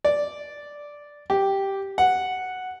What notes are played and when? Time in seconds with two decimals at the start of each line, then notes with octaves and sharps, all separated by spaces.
0.05 D5
1.30 G4
1.98 F#5